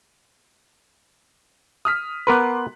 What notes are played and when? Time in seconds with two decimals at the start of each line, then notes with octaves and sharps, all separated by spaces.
1.85 D#6 F6 B6
2.27 B3 A#4 B4 C6 D6 F#6